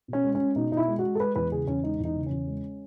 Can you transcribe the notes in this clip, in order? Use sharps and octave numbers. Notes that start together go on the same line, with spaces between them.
B2
C#4
G#3
G#3 C#4
B2 D#4
B2 D#4
E4
G#3
G#3 F#4
A4
G#3 B4
E2 B4
C#3 G#4
E2 C#4
G#3 D#4
E2
D#4
C#3
E2 C#4
G#3